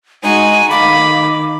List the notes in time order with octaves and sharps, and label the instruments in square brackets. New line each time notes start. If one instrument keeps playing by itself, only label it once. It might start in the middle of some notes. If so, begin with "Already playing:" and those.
[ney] G#3 [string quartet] D#4 F#4 [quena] G#5
[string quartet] D#3 [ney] F5 [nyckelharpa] B5 [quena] D6